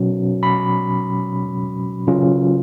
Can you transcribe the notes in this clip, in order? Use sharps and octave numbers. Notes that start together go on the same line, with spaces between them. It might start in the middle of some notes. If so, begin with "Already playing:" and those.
Already playing: B2 F#3 C#4
B5
C#3 F#3 C#4 F4